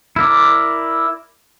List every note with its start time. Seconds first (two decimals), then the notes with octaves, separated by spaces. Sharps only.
0.16 E4 A#4 D5